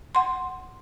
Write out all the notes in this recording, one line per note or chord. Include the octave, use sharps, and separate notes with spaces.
F#5 C6